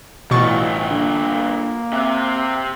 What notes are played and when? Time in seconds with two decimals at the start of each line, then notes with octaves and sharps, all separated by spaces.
0.31 A1 G2 B2 E3 F4 C#6 A6
0.91 D3 A#3
1.93 C3 C4 E5 D6 F#6